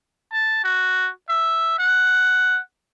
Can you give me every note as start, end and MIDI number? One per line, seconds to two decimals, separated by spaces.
0.32 0.62 81
0.64 1.10 66
1.29 1.74 76
1.79 2.60 78